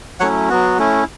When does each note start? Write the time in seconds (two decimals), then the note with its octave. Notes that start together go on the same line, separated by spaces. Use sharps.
0.20 F#3 A3 C#4 E4 C#5 F#5
0.49 F#3 B3 F#4
0.78 A3 C#4 E4